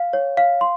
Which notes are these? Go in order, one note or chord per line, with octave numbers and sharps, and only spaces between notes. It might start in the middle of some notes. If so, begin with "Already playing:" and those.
Already playing: F5
C#5
F5
C6